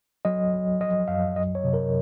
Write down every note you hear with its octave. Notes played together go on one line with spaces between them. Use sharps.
F#3 D#5
F#3
F3 D#5
F#2 F5
F#3 D#5
C#5
C3
A#4